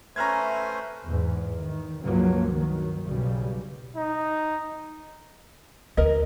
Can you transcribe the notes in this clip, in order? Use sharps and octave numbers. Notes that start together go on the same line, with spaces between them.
A3 C#4 B4 C5 E5 A#5 F6 G#6
E2 G#2
D#3
C#2 G2 C#3 F3 F#3 A#3
D#3 F#3
B1 C#3 G3
D#4
D2 A#4 D#5